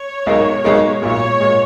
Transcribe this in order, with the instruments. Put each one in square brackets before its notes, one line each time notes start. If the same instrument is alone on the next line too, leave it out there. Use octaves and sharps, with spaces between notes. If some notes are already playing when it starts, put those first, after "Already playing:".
Already playing: [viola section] C#5
[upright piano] B1 B2 G#3 D#4 A#4
B1 B2 G#3 D#4 A#4
[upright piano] B1 A#2 G#3 [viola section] C#5
[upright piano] A#2 G#3